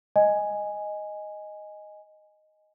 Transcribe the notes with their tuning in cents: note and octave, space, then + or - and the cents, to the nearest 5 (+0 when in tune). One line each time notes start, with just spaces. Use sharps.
D#5 +0 G#5 +0